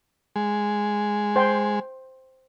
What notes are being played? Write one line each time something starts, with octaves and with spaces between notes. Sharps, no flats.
G#3
C5 G5